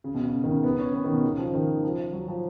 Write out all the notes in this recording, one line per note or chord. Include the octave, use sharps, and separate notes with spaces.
C#3
B2
C#3
D#3
C#3
B3
C#4
B3
D#3
B2
C#3
F3
D#3
F3
F#3
F3